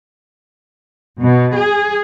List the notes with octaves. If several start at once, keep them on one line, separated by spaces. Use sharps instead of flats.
B2
G#4